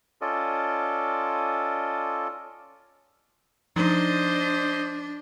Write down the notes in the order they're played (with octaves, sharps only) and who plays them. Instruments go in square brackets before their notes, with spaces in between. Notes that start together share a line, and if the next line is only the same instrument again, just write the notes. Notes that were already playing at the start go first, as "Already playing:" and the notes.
[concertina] C#4 F4 A4 D5 D#5
[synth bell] F3 D#4 [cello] D4 [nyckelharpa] C5 D#5